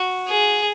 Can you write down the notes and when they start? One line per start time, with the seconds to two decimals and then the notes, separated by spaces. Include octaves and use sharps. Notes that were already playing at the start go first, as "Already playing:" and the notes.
Already playing: F#4
0.29 G#4